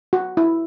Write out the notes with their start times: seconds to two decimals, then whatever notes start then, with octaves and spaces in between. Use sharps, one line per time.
0.13 F#4
0.37 E4